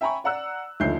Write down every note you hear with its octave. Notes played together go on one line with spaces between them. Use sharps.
E5 G5 G#5 A#5 B5 C#6
D5 F#5 A#5 E6 F#6
D#1 D2 F3 D#4 G6 C7